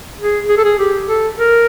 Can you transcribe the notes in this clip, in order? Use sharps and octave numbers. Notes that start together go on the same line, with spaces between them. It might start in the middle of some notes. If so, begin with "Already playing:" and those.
G#4
G#4
A4
G#4
G4
A4
A#4